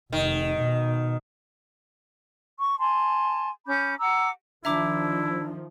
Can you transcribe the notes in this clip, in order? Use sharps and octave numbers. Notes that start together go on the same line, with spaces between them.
F1 D#3
B2
C#6
G#5 A5 C6
C#4 B5 D6 G6
F#5 A#5 D6 E6
D#3 F3 D4 E4 E5 A#5 D6